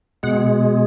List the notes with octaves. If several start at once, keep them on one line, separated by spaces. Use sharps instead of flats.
B2 G#3 F#5